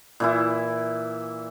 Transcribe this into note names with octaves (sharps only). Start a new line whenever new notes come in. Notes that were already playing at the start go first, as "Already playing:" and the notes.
A#2 E3 E4